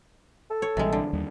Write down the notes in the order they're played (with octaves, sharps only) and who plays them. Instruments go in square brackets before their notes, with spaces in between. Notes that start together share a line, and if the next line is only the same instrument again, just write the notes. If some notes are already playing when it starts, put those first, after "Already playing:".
[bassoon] A4
[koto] C#5
[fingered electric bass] A#1 E3 G3 [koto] C3 G#3
[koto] D3
[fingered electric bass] D#2 G3